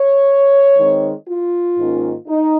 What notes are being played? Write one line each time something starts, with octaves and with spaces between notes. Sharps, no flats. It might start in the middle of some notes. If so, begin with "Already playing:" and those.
Already playing: C#5
D#3 G#3 C4
F4
G#2 D#3 A#3 C#4
D#4